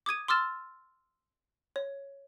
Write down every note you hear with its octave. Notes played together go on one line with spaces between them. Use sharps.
D6 D#6 G#6 D#7
C6 D6 E6 F6 A6 E7
C#5